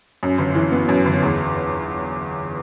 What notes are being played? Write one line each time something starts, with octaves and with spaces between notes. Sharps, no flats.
F#2
G1
E3
B3
F#2
G1
E2